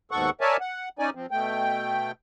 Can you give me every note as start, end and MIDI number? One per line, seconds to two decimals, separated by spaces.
0.11 0.30 39
0.11 0.30 44
0.11 0.30 47
0.11 0.30 69
0.11 0.30 78
0.11 0.30 85
0.41 0.57 70
0.41 0.57 73
0.41 0.57 74
0.41 0.57 76
0.41 0.57 80
0.41 0.57 81
0.60 0.89 78
0.99 1.10 61
0.99 1.10 63
0.99 1.10 74
0.99 1.10 80
1.15 1.26 53
1.15 1.26 60
1.31 2.12 47
1.31 2.12 57
1.31 2.12 79